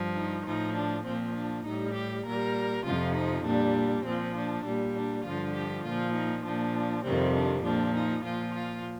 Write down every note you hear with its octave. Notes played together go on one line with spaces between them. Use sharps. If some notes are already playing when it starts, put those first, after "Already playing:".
Already playing: G2 F3
D#4
A2 F3 D#4
D4
A#2 F3 C4
D4
A2 G3 D#4
G4
A#2 G3 A#4
F2 C3 F3 F4
D#4
A#2 G3 D4
A#2 F3 C4
D4
A#2 G3
D4
G2 D3 F3 F4
G4
A#2 F3 F4
D#4
A#2 F3 D4
F2 C3 D#3 G3 C4
D4
A#2 F3 D4
D#4
A#2 F3 F4
F4